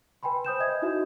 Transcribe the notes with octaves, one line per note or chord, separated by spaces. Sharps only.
B4 G5 G#5 B5 C6
C5 D#6 G6 E7
D#5 E5 G#6
D#4 E4 F#4 E5